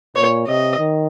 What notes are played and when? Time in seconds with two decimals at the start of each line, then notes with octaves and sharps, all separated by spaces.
0.16 A#2 C#5
0.47 C3 D#5
0.78 D#3